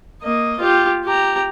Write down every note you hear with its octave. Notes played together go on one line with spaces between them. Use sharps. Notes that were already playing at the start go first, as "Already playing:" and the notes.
A#3 D#5
F4 G4
G4 A#5